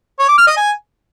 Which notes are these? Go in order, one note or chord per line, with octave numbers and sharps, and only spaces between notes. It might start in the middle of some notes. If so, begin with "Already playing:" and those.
C#5
D6
F6
D#5
G#5